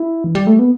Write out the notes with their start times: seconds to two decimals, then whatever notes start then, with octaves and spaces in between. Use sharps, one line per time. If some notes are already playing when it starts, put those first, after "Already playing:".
Already playing: E4
0.24 E3
0.35 G3
0.47 A3
0.59 B3